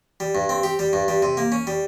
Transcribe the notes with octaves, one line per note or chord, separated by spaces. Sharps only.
G3
G2
C4
G4
G3
G2
G3
C3
A#3
C#4
G3